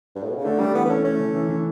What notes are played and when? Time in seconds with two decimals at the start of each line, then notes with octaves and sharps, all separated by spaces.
0.16 G2
0.23 A2
0.30 B2
0.37 C#3
0.45 D3 A3
0.59 G3 D4
0.74 E3 B3
0.85 B3
0.89 C#4 A4
1.04 A3 C#4
1.20 E3
1.35 E3
1.49 E3